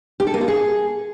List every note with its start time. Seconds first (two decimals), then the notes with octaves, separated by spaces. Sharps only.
0.20 G4
0.27 A4
0.34 A#3
0.41 F4
0.48 G#4